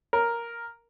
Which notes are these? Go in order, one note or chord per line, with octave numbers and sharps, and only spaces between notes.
A#4